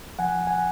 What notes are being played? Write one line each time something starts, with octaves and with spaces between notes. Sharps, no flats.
F3 F#5 G#5
F#5 G#5